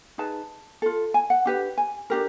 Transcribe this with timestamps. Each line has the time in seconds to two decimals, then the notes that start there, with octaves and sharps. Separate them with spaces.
0.18 D#4 G#4 B4 A5
0.82 F4 A4
1.14 G#5
1.30 F#5
1.45 D4 G4 B4
1.78 G#5
2.10 D4 G4 A#4